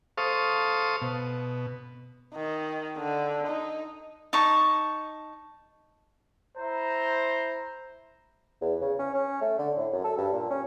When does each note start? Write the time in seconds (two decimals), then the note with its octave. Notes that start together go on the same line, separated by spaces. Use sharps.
0.18 A4 C5 F5 C#6 D#6
1.01 B2
2.34 D#3
2.98 D3
3.48 D#4
4.33 D#4 A5 C#6
6.58 E4 C5 A#5
8.61 E2
8.81 C#3
8.99 C#4
9.14 C#4
9.41 A3
9.59 D3
9.77 A2
9.93 F#2
10.04 A4
10.18 G2
10.33 A#2
10.50 C#4